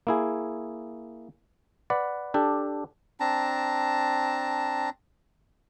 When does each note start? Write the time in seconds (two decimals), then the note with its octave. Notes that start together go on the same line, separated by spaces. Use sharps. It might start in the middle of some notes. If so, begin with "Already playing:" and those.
0.07 A#3 E4 G#4
1.90 B4 D5 F#5
2.34 D4 G4 A4
3.20 C4 D4 A5 A#5